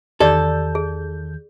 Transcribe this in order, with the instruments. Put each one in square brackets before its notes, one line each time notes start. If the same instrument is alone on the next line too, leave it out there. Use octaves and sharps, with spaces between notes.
[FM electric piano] E2 D#3 G6 [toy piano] G4 D5 D6 [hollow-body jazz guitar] A4
[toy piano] G#4